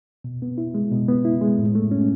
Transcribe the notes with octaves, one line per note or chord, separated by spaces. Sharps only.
B2
B3
E4
G#3
B2
B3
E4
G#3
A2
A3
C#4